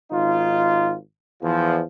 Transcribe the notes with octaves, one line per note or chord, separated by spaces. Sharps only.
G#1 D#4 F4
E2 F3